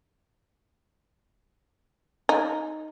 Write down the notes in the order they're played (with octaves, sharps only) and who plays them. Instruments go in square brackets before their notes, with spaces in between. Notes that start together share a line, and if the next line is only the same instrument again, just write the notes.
[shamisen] D#4